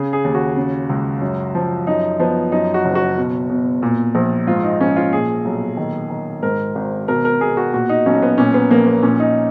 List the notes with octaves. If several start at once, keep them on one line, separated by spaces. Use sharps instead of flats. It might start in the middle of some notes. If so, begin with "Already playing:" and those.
Already playing: C#3 G#4
G#4
D#2
F#4
C#3
C#2
F#2
F3
F#2 D#4
F3 B3
F#2 D#4
F#4
F#1
F#4
B2
B2
A#2
A#1
G#2 F4
D#4
A#1 C#4
F4
A#2 G#4
B1
D#3
D#3
G#2 A#4
G#1
B2 A#4
A#4
B2 G#4
F#4
A#2 F#4
D#4
B1 C#4
B3
A#2 C#4
B3
A#1 A#3
B3
A#2 C#4
D#4